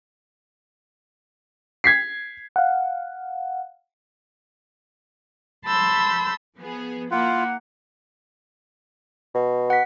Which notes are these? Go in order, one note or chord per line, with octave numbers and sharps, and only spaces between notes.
G#6 B6 C7
F5 F#5
A5 B5 C6 E6 G6
F3 B3 G#4
A#3 E4 F4 F#5
B2
F#5 B6